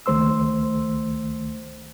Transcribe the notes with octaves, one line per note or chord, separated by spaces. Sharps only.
C#2 D#3 A3 C5 C6 E6